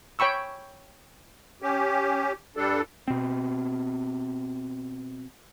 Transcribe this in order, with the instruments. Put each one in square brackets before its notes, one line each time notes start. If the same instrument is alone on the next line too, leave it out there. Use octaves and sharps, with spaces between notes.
[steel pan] C#5 G5 B5 C#6 E6
[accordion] C#4 G4
G2 G3 D4 A4
[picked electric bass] B2 C4